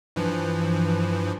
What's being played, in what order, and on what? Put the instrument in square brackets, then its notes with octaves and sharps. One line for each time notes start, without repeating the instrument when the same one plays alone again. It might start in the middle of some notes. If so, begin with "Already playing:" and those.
[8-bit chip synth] G2 E3 F3